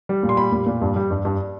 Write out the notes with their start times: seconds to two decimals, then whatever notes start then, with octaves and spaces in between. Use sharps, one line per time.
0.09 G3
0.23 A#2
0.29 C6
0.37 G3 B5
0.52 A#2
0.67 A#2
0.82 G2
0.96 G3
1.11 G2
1.25 G2